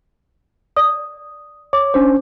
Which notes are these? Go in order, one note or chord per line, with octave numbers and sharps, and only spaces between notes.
D5 D#6
C#5 D6
C#4 D4 C5